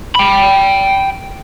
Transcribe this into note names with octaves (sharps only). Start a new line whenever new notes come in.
G5 B5